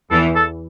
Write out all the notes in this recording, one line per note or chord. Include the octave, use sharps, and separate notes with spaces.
E2 E3 A4
A4